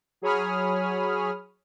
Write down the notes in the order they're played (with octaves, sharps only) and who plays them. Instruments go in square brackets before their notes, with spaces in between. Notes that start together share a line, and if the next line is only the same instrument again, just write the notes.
[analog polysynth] F#3 G#4 C#5 B5 D#6 F6